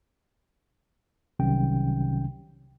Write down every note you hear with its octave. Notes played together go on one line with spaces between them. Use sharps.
C2 C3 D#3 F#3 C#4 G5